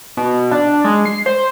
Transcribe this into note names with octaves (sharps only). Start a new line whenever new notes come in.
B2
D4
G#3
C7
C5